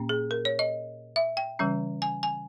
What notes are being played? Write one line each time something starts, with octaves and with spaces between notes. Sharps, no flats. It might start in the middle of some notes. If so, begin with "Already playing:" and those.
Already playing: A#2 A#3 C#4
G#4
A#4
C#5
D#5
E5
G5
C#3 E3 G3 C#4
G#5
G#5